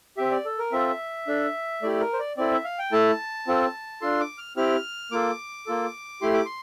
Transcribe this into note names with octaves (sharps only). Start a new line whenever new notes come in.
C4 G4 E5
D5
A4
A#4
C4 F4 A4 E5
D4 A4
A3 E4 G4 D5
A#4
C5
D5
C4 E4 A4 D5
E5
F5
G5
A3 E4 A4 A5
C4 F4 A4
D4 F4 A4 C6
D6
F6
C4 E4 G4 F6
A#3 F4 A4 D6
A#3 F4 A4
A3 E4 G4 C6
D6
C6